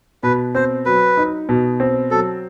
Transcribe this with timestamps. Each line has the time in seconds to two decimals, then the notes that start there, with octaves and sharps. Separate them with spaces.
0.23 B2 B4
0.55 C4 C5
0.86 F#3 B4
1.17 D#4
1.49 B2
1.80 C4
2.11 F#3 A4